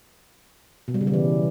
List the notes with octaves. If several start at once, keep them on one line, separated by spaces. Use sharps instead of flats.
B2
G3
C#3
G3
E3